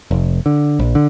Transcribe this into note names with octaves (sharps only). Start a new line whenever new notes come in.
F1
D3
A#1
D3